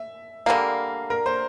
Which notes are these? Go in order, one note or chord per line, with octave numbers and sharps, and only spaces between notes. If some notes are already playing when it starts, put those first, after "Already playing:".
Already playing: E5
D3 G3 A#3 F5
A#4
C5